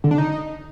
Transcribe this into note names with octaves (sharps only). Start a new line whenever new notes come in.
D3
D4
D#4